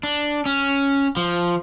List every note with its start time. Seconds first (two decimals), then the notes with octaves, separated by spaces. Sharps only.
0.03 D4
0.46 C#4
1.17 F3